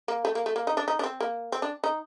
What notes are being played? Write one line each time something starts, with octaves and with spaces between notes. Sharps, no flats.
A#3
A3
A#3
A3
A#3
D#4
D4
D#4
D4
C4
A#3
C4
D4
D#4